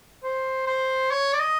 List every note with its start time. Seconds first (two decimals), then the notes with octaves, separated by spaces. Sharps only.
0.23 C5
0.66 C5
1.11 C#5
1.33 D5
1.39 D#5